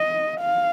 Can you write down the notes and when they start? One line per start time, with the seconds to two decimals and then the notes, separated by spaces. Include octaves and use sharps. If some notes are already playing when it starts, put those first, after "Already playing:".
Already playing: D#5
0.40 F5